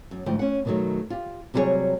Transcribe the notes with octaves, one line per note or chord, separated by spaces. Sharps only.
F#2
D2 G#2 F3 G5
C#4 F#5
B2 D3 D#3 F3 F#3 A3
F4 G4
C3 F#3 G3 E4 G#4 C#5